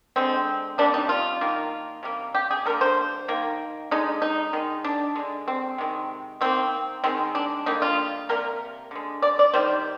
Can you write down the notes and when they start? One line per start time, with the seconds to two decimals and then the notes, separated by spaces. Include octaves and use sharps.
0.16 D3 G#3 C4
0.78 C3 G3 A#3 D4
0.94 D#4
1.09 F4
1.41 D#3 A#3
2.03 C3 G3 A#3
2.35 G4
2.51 G#4
2.66 D3 G3 A#3 A#4
2.81 C5
3.28 D#3 A#3
3.91 D3 G#3 D#4
4.22 D#4
4.53 D#3 G#3
4.84 D4
5.16 D3 G#3
5.48 C4
5.78 C3 D#3 G#3
6.41 D#3 A#3 C4
7.04 D#3 G#3 C4
7.35 D4
7.66 D3 G3 A#3 D#4
7.82 F4
8.29 C3 G3 A#3 A#4
8.91 D3 G#3
9.22 D5
9.39 D5
9.54 D#3 G3 C5